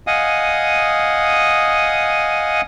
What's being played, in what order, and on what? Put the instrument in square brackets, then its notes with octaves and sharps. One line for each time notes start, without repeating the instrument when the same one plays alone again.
[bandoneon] D#5 F5 F#5 G#5 D#6